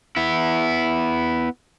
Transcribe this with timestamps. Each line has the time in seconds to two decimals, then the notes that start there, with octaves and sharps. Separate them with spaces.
0.16 B3 E4